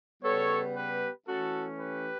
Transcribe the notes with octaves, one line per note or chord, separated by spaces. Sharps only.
C#3 G3 B3 A4 C#5
G4 B4
E3 A3 C#4 F#4 A4
G4 B4